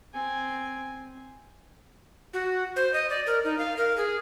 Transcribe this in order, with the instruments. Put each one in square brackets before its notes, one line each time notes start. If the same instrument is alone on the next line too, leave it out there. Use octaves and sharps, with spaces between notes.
[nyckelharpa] C4 G#5
[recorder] F#4
C5
D#5
D5
A#4
D#4
F5
A#4
G#4